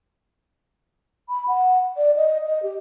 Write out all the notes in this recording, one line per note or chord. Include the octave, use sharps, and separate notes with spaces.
B5
F#5
D5
D#5
D#5
G4